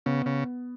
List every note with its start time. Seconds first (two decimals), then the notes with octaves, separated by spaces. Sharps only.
0.06 C#3 B3
0.26 C#3